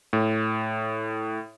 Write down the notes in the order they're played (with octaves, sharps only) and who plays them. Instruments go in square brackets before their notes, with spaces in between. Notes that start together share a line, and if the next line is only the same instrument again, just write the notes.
[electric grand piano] A2